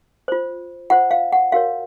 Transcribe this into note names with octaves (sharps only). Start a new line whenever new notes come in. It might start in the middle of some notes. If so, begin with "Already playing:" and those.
F4 C5
F4 C5 F#5
F5
F#5
F#4 A#4 C#5 F5